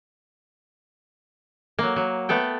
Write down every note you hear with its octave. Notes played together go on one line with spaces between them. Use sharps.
F#3 A#3
F#3
A3 B3 A4 G5